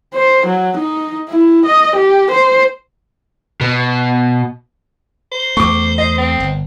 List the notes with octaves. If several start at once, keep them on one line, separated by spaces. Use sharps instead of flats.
C5
F#3
D#4
E4
D#5
G4
C5
B2
C5
E2 A3 C#6 D6
D#5
C4
G1